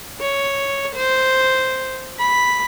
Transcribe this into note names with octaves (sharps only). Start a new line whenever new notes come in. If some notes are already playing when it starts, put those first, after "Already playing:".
C#5
C5
B5